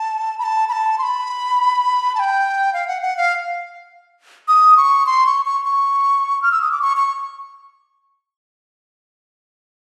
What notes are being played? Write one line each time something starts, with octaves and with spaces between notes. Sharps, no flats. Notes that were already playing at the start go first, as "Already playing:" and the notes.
Already playing: A5
B5
A5
B5
A5
C6
B5
A5
G5
F5
F#5
F#5
F5
D#6
C#6
C6
C#6
C#6
C#6
F6
E6
D#6
D6
C#6
C#6